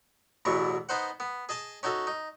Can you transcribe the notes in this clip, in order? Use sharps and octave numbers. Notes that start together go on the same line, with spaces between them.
A1 E2 B2 E3 F#3 C#6
B3 D#4 C5 F#5
B3
G#4 D#5 A5 D#6
C#4 D#4 F#4 A4
D#4